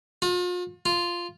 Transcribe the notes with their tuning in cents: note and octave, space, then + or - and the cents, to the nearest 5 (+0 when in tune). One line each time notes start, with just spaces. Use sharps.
F4 +40
F4 -5